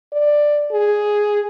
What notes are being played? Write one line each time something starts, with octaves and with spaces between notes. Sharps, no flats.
D5
G#4